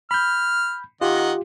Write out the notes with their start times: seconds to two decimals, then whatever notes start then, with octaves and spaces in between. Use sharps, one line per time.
0.11 B5 F6 G6
1.01 D#3 F4 G4 D#5 F#5